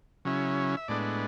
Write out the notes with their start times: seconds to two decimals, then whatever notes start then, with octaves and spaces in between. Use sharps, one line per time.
0.25 C#3 F#3 C#4 E4
0.77 E5
0.88 A2 G#3 B3 D4 D5